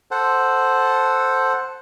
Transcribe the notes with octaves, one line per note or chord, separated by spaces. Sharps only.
A4 C5 F#5